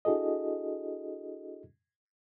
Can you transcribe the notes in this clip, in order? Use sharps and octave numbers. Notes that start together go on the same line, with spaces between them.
D4 E4 F#4 G#4 A4 D#5